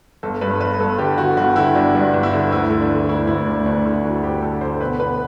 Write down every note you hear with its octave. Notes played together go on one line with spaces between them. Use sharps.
G1 A4
G2 B4
G1 B4
G1 A4
D3 G4
D3 F#4
G1 F#4
D3 E4
G1 D4
G2 D4
G1
E4
D3
D2 E4
D3
D4
D3
D2 E4
D2 E4
D2 D4
D2 D4
D3 E4
D3 F#4
D2 G4
D3 A4
D3 C5
B2 B4
B2 B4